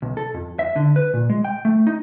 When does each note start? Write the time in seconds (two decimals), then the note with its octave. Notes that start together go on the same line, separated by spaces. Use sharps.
0.02 B1
0.17 A4
0.34 F2
0.59 E5
0.76 D3
0.96 B4
1.13 A#2
1.30 G#3
1.45 G5
1.65 A3
1.87 D#4